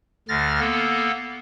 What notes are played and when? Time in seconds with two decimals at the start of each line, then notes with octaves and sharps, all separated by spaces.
0.29 D2 D3 F6 A6 A#6
0.60 A#3 B3 A4